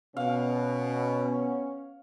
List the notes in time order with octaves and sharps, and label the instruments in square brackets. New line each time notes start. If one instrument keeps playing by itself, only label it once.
[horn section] B2 [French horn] B3 [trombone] C#4 [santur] F5